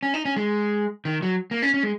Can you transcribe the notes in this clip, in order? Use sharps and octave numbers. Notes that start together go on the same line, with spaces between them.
C#4
D#4
C#4
G#3
D#3
F#3
A#3
C#4
C#4
G#3